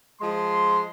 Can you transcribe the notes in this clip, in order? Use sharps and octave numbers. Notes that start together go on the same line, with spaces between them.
F3 G#3 C6